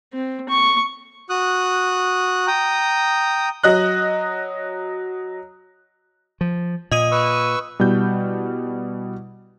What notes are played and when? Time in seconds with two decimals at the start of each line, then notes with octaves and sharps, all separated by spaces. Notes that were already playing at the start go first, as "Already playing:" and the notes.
0.13 C4
0.49 C#6
1.30 F#4 D#6 F#6
2.47 G5 A#5 D#6
3.64 F#3 D#5 F#6
6.41 F3
6.91 A#2 D#5 D#6 D#7
7.12 B4 C#6 E6
7.79 B2 G3 E4 G6